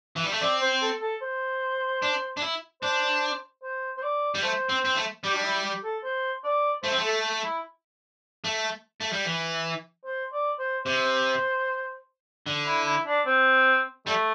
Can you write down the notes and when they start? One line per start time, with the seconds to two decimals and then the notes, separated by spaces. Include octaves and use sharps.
0.16 E3
0.24 G3
0.33 A3
0.41 C4 D5
0.61 C5
0.82 A4
1.01 A4
1.21 C5
2.02 D4
2.37 D4
2.42 E4
2.82 D4 C5
3.63 C5
3.97 C5
4.02 D5
4.35 G3
4.43 A3 C5
4.69 C4
4.85 C4
4.96 A3
5.24 G3 G4
5.34 D4
5.43 E4
5.63 G4
5.83 A4
6.04 C5
6.44 D5
6.83 A3 C5
6.91 C4
6.98 A3
7.04 A4
7.44 E4
8.44 A3
9.01 A3
9.13 G3
9.25 E3
10.05 C5
10.32 D5
10.59 C5
10.85 C3 C5
12.46 D3
12.66 E4
12.85 E4
13.06 D4
13.26 C4
14.07 G3 A3